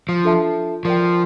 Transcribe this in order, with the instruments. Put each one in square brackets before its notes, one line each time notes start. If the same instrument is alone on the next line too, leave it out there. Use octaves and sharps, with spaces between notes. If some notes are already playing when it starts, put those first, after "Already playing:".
[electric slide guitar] F3
[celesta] D4 F4 A4 E5 A5
[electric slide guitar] F3 [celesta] A#4 D5 G5